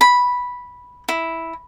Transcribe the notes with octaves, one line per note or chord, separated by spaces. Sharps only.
B5
E4